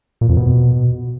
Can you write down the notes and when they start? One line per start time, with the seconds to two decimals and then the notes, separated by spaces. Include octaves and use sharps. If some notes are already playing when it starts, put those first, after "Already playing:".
0.21 A#2
0.29 F2
0.37 B2